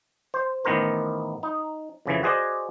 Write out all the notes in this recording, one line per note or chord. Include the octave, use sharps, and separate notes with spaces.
C5
A1 D#3 B3 A#4 C5
D#4
F2 C#3 E3
F#4 G#4 C5 D5 D#5